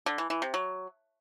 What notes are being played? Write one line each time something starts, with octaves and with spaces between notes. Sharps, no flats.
D3
E3
E3
C3
F#3